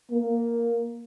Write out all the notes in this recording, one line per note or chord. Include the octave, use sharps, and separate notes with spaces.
A#3